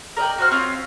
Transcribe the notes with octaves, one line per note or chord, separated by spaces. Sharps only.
A#4 D5 D#5 G5
F#4 C5 F6
C4 C#4 F4